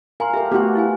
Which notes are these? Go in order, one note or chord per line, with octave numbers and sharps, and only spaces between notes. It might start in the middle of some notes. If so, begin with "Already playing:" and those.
A#4 F5 G#5 A#5 C6
G4 A4 A#4 E5
A3 B3 D4 F#4 G4 C6
E4 F5 G#5